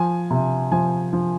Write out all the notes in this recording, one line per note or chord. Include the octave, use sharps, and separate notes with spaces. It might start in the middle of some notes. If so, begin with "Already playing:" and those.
Already playing: F3 G#5
C3
F3 G#5
F3